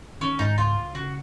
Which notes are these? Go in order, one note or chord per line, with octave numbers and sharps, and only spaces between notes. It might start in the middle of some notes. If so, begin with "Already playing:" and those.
D#3 C#4
G#2 D#4
C#2 F4
C#2
C#3 F#4